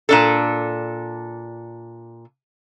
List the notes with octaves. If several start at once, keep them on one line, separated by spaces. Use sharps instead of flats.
A#2 D4 A4